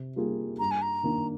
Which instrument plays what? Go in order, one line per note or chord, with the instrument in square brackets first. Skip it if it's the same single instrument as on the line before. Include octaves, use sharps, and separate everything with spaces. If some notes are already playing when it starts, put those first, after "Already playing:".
Already playing: [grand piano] C3
G3 A#3 F4 G#4
[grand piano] G2 [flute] A#5
[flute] G#5
A#5
[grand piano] D#3 A#3 D4